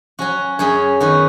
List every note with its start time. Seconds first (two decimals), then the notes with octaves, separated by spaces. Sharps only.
0.19 F#3 C#4 F#4
0.59 F#2 F#3 C#4 G#4
1.00 D#3 B3 F#4